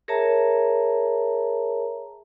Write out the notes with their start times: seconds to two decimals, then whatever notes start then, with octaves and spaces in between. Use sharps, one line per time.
0.08 G#4 A#4 C#5 E5 A5 A#5